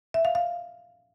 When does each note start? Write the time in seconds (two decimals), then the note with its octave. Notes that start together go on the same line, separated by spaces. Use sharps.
0.14 E5
0.25 F5
0.35 F5